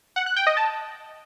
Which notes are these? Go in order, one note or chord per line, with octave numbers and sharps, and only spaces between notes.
F#5
F#6
G5
D#5
A5